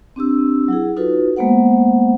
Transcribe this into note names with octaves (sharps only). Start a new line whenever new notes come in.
C4 D4 G4 E6
F#3 E4 G#4
D#4 F4 F#4 A4 B4
G#3 A#3 B3 C5 F#5